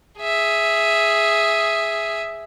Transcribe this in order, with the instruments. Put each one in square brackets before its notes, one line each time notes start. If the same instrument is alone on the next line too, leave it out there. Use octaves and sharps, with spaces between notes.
[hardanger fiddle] G#4 E5